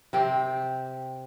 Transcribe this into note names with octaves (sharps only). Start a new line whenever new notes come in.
C3 C4 G4